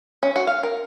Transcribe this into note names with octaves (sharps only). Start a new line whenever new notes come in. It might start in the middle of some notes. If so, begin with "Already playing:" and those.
C#4
F#4
F5
A#4